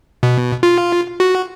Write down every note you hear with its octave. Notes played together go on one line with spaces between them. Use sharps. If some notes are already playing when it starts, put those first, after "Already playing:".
B2
F4
F#4